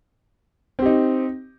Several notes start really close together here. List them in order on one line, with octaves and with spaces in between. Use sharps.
C4 G4 D#4